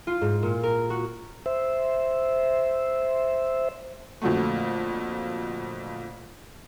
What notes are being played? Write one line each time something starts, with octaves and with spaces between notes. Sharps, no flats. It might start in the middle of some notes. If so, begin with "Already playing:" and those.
F4
G#2
A#2
A#4
F#4
C5 E5
F2 A#2 D3 F#3 A3